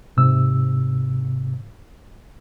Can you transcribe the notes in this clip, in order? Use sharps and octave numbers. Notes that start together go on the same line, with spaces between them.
G#2 C3 E6